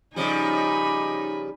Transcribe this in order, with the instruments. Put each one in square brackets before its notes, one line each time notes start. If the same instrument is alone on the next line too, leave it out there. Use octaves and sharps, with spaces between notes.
[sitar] C#3 F3 G3 [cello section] D#4 [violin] G#5 B5